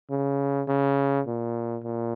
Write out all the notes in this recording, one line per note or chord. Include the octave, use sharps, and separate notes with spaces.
C#3
C#3
A#2
A#2